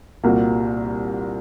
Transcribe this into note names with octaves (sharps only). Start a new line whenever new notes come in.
C2 A#2 G3 A#3 F#4